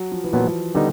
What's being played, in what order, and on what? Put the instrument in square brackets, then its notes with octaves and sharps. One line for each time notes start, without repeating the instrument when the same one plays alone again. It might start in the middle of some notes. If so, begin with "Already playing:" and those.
Already playing: [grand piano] F#3
F3
E3
[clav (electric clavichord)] A#2 F#3 B3 [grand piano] F3
[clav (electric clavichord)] D3 G3 B3 D#4 [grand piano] D#3